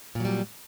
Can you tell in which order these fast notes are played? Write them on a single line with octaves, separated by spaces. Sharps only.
A#2 F#3 G3